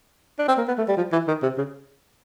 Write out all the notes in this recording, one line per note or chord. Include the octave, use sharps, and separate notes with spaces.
D4
C4
A#3
B3
A3
G3
F3
E3
D#3
C3
C#3